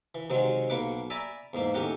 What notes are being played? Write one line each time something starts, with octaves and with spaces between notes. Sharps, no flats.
E3
C3 D#3 F#3 G#3 C4
B1 A#3 B4 F#5 D6
D5 E5 G#5 A#5 B5 D6
E2 G#2 A#3
D#2 A2 C#4 G4 A#4 F#5